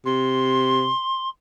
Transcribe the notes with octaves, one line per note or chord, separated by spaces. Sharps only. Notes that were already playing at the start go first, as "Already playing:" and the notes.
C3 C6